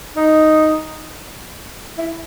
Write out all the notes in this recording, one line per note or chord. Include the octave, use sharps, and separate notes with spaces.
D#4
E4